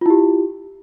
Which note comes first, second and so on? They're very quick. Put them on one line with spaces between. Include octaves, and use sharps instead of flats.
F4 E4 G4